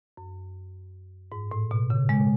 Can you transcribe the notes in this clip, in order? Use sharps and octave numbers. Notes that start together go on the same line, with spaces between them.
F#2
G#2
A2
B2
C#3
G#3